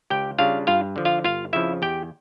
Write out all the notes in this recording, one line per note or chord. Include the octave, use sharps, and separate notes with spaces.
C#2 G4 G5
C#3 G3 D4 F4 F5
G2 F4 F5
D3 F3
F4 F5
G1 F4 F5
F2 C#3 F3 E4 E5
E2 G4 G5